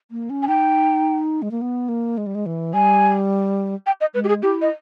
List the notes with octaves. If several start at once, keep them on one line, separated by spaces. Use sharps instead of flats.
A#3
C#4
G#5
D#4 G5
G#3
A#3
B3
A#3
G#3
G3
G#3
E3
G3 G#5
G5
D#5
G#3 B4
G4
G#4
E4 G4
D#5